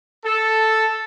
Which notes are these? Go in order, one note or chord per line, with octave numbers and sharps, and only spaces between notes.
A4